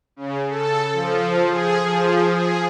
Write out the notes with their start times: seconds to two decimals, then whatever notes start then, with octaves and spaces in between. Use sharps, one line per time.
0.16 C#3
0.49 A4
0.93 F3
1.49 G#4
1.84 F3
2.35 G#4